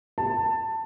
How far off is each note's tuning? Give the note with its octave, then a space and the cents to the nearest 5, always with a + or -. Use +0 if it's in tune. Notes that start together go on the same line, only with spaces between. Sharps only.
A5 +15